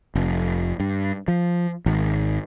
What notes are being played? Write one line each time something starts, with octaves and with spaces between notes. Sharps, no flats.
F1
G2
F3
G#1